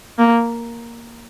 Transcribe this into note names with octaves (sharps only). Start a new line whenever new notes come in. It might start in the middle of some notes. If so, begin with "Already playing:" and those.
A#3